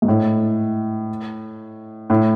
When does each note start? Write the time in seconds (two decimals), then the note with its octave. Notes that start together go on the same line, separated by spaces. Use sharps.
0.02 G#2
0.08 A2
2.10 A2